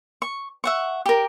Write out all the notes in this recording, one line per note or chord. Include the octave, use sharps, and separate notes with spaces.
C#6
E5 F#5 C#6
G4 A#4